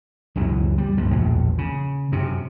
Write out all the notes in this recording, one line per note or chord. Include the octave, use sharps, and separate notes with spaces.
C#2 F#2 B2 E3
G3
C#2 G2 F3
A#1 E2 A2
C#3
F#2 C3